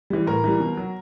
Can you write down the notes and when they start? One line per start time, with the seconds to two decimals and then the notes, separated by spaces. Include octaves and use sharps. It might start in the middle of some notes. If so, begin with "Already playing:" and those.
0.10 E3 G3
0.27 A2 A#4
0.44 E3 G3
0.60 B2
0.77 F#3